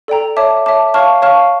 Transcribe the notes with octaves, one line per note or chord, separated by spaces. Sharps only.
A4 D5 G5 A#5
C#5 E5 A5 D6
C#5 E5 A5 D6
C#5 F5 A5 C#6 F6
C#5 F5 A5 C#6 F6